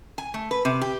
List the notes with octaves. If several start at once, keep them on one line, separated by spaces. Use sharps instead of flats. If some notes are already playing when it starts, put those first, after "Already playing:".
G#5
A3
B4
C3
G4